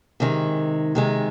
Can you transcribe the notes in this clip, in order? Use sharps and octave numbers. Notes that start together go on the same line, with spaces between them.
C3 D#3 G#3
C3 D#3 G#3